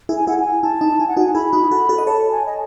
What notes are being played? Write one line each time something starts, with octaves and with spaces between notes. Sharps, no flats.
E4 G#4
G#5
E4 G#4 F#5
G#5
E4 A5
D#4
E4 G#5
F#5
D#4 F#4 G#5
E4 G#4 B5
D#4 F#4
F#4 A4
F#4 A4
D#5
A4 C#5 A5
G#5
D#5